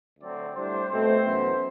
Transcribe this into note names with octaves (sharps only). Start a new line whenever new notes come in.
D2 D3 F#3 C4 D5
A2 G3 D4 C5
B2 A3 C4 C5
F#2 E3 B3 E4